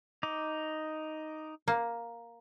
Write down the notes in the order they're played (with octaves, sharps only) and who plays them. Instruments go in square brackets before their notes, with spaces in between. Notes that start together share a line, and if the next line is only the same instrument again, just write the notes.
[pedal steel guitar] D#4 D6
[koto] A#3